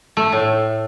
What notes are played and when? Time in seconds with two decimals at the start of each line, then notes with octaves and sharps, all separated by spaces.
0.17 A3
0.32 A2